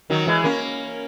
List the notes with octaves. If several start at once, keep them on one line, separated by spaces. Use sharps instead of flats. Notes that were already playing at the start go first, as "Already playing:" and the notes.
D#3 F#3
E3 G#3
A#3 C#4